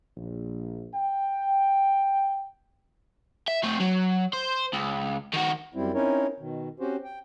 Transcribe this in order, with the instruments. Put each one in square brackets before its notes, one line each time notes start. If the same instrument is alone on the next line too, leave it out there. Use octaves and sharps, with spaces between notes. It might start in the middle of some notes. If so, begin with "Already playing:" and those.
[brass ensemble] A#1
G5
[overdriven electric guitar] E5
A3 C4
F#3
C5
C#2
D#3 F#4
[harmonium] F#2 G3 C4 E4
C4 C#4 D#4 E4 A#4 C#5
B2 D#3
C4 C#4 F#4 G4 C5
G5